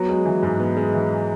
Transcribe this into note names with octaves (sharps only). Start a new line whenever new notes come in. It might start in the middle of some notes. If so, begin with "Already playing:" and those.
Already playing: F#3 B3
G#3
E3
G#2
B3
G#3
E3